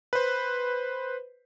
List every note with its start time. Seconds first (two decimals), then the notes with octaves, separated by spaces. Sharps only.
0.13 B4 C5